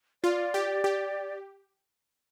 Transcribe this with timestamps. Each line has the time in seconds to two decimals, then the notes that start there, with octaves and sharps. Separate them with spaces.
0.23 F4 D5
0.54 G4
0.84 G4